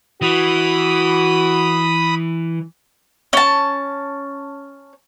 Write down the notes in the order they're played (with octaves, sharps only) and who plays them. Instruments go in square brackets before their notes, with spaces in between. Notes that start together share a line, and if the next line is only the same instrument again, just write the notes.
[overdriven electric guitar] E3 [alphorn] F#4 [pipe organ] B5 D#6
[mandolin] C#4 A5